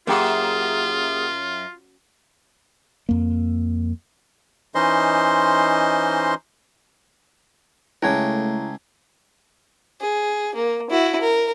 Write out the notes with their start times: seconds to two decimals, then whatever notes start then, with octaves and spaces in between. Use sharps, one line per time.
0.07 F#2 A#3 F4 G4 G#4 F#5
3.09 F2 A#3
4.75 E3 C#4 D#4 C5 D#5 C6
8.02 C#2 C#3 A3 E4 G5 A5 G#6
10.01 G#4
10.55 A#3
10.90 E4 F#4
11.21 A#4